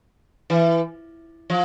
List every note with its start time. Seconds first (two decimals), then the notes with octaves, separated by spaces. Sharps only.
0.50 E3
1.50 F3